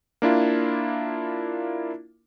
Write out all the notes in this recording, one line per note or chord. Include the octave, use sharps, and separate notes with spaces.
A#3 D4 E4 F4